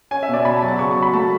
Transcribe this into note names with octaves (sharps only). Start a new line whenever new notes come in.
C#4 G#5
E5
B2
D5
B2 B5
A5
F#3
A5
C#3 C#6
C#6
F#3
B5
A3 A5